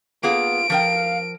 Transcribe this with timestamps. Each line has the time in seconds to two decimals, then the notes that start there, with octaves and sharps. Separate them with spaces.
0.23 A#3 B3 F4 G#4 D7
0.70 F3 A#4 F5 G5